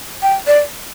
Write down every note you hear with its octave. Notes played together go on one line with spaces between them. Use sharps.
G5
D5